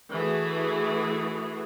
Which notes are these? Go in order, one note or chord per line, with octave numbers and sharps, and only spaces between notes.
E3 A3 F#4 G#4